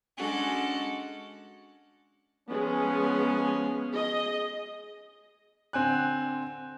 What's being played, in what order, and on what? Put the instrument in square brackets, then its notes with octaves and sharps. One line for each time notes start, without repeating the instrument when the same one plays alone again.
[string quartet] G#3 C#4 D4 F#4 A4 F#5
[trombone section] F3 C#4 [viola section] G#3 B3 G#4
[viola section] G#4 D#5
[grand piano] D3 C4 G#5 F#6